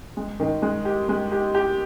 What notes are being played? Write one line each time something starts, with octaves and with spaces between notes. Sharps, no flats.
G#3
D#3
G#3
G4
G#3
G4
G4